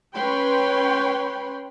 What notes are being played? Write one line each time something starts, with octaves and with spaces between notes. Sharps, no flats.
C#4 B4 C#5 G5 B5 C6